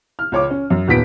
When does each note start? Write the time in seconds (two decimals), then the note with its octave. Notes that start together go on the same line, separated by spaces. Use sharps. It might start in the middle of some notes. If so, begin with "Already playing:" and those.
0.19 F6
0.32 C#2 C#5 D6
0.50 C#4
0.70 F#2
0.88 D#1 A#2 B3 B6 D7